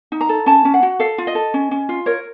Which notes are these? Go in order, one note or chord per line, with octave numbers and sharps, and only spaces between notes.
D#4
A#5
A4
C#4 A5
C#4
F#5
F#4
A4 F5
F4
D#5
A4
C#4
C#4
F4
A#4 C#5